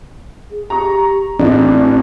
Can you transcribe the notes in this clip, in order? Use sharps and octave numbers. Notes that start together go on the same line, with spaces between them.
G#4
G4 A#5 C#6
A1 C4 D4 D5